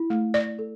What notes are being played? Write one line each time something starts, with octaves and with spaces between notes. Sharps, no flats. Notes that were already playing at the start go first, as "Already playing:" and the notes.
Already playing: E4
A3
D5
A4